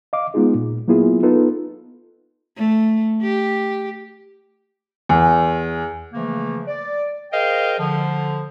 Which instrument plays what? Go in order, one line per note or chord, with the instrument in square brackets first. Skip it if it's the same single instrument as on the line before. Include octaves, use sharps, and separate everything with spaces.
[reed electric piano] D#5 F5 D6
G#3 B3 D#4 F4 G#4
A#2
F#3 A#3 B3 E4 F4 G#4
B3 D#4 F4 A4 B4
[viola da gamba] A3
G4
[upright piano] E2
[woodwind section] C#3 E3 F3 A3 A#3
D5
G#4 A#4 C5 D#5 F5 G5
D3 F3